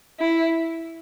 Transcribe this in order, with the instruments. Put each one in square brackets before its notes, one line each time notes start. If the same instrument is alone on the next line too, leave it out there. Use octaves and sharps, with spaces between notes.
[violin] E4